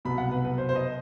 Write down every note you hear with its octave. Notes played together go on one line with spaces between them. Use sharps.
C2 B2 F#3 B3 B5
F#5
B4
B4
C5
C5
D#5